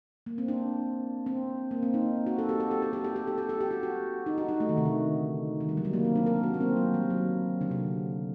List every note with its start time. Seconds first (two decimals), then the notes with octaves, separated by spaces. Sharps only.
0.26 A#3
0.38 C4
0.48 D4
1.26 C4
1.71 A#3
1.83 C4
1.94 D#4
2.27 F#4
2.38 A4
2.49 G4
2.60 A4
2.71 G4
2.82 A4
2.93 G4
3.04 G4
3.16 A4
3.27 G4
3.38 A4
3.49 G4
3.61 G4
3.71 F#4
3.83 F#4
4.26 D#4
4.38 F#4
4.49 D#4
4.60 A3
4.69 D#3
4.77 C3
4.85 D3
5.60 D#3
5.69 G3
5.77 F#3
5.85 G3
5.93 A#3
6.05 C4
6.15 D4
6.26 A#4
6.43 F#4
6.54 A#3
6.61 C4
6.76 F#3
6.94 G3
7.10 F#3
7.61 D3
7.71 C3